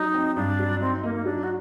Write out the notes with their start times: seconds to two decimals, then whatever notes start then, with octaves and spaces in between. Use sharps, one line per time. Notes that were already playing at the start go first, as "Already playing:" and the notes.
Already playing: F#3 D#4
0.14 C4
0.36 G2 D4
0.59 F#3
0.81 C4 D#4
1.03 A#3 D#4
1.15 A#3
1.25 F#3 D4
1.44 F#4